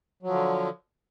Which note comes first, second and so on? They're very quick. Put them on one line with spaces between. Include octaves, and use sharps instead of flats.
F#3 F3 D3